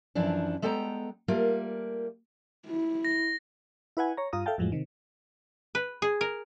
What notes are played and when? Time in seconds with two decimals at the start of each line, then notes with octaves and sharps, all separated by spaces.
0.15 F#2 E3 F3 D4
0.62 G#3 B3 A4 G5 A5 A#5
1.28 G3 A3 A#3 F4 A#4
2.67 E4
3.05 A#6
3.97 E4 B4 F#5 G#5
4.17 C#5 A#5
4.33 G2 F4 A#5 D#6
4.46 A4 E5 F5 G5 A5
4.58 F2 A2 F3 F#3 G#3
4.72 C3 D#3
5.75 B4
6.02 G#4
6.21 A#4